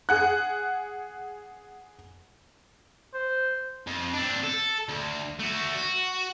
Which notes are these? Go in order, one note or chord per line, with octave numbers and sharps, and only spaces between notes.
G#4 F#5 F#6
C5
F2
C4 D4
A4
D2
A3 F#4
F#4